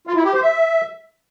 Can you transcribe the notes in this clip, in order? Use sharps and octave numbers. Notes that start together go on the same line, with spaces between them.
F4
E4
G4
C5
E5